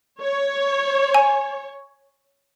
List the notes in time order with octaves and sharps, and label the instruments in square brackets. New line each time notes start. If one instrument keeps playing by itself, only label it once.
[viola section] C#5
[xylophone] G#5